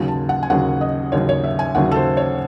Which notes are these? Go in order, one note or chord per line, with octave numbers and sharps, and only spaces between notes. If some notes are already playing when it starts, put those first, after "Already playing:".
Already playing: D#2 C#3 F#3 G#5
A5
F#5
G#5
D#2 C#3 F#3 F#5
D#5
D#2 C#3 F#3 C#5
C#5
E5
G#5
D#2 C#3 F#3 F#5
A4
C5
C#5